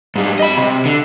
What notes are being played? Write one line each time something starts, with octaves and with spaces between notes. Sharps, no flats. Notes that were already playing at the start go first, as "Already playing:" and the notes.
G#2 G3
D#5 B5
C3
D3